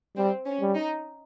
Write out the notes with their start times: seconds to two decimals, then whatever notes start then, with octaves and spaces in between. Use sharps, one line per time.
0.17 G3 C4
0.46 C#4
0.61 G3
0.75 D#4